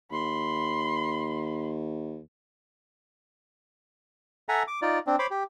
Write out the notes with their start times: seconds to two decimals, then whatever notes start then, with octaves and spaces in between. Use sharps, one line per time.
0.11 D#2 B5 C6
4.49 A4 E5 F#5 G#5 A#5
4.67 D6
4.82 D#4 F4 D5
5.07 C4 D4
5.19 C5 C#5 B5 D6
5.31 G4